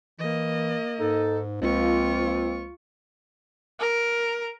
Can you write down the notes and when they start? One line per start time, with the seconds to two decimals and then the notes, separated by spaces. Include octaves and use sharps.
0.19 E3 A#3 D#5
0.99 G#2 D#4 A4
1.61 C#2 F3 A#3 C4 F4 C#6
3.80 A#4